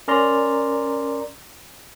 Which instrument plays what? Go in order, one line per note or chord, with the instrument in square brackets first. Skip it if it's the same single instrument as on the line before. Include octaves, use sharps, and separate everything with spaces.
[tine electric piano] C#4 A#4 D5 A#5 C6